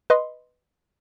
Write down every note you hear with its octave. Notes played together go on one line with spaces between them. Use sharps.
B4 D#5 C6